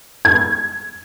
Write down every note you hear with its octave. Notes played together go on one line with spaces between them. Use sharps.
G#6